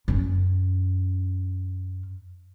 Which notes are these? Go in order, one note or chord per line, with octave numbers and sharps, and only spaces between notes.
F#2 C#4